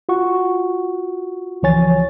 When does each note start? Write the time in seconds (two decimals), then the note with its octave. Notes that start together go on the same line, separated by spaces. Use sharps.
0.09 F4 F#4 F#5 C#6
1.63 C#2 E3 F3 C#5 G#5 A6